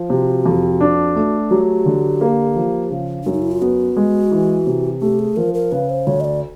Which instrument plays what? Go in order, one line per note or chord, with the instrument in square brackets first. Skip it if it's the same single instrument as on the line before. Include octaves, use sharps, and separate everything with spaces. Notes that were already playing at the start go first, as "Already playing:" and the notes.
Already playing: [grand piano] F3
[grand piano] C3 [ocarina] F#4
[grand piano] F2
D4
A3
[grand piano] F#3 [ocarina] G4
[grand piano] D3
A#3
F3
C#3
[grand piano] F#2 [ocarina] D4
[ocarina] D#4
E4
F4
[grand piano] B3 [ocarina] F#4
[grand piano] G#3
E3
C3
[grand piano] A3 [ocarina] G4
[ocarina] G#4
[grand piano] F3 [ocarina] A#4
[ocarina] A#4
[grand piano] C#3 [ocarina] B4
[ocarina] C5
[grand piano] D2 [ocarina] C#5
[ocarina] D#5
D5